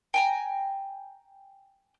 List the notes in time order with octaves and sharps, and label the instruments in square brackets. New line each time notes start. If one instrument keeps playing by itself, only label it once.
[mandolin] G5 G#5 A#5